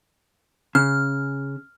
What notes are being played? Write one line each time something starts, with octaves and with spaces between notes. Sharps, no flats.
C#3 F6